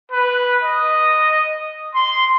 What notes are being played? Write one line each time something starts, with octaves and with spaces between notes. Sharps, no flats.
B4
D#5
C6